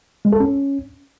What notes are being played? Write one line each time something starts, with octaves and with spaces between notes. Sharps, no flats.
G#3
A4
C#4